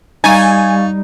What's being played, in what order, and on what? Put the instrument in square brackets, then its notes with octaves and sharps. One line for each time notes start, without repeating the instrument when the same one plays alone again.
[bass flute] G3 [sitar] D#4 [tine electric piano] F5 C#6 A6 [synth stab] G#5